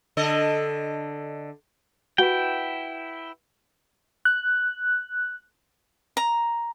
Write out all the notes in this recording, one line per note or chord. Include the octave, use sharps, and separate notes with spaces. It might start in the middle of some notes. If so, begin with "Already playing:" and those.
D3 A4 D#5
E4 F#4 B4 F#5 G5
F#6
A#5